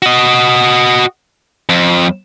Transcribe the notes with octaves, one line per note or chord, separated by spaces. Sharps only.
F#4 D#5
F2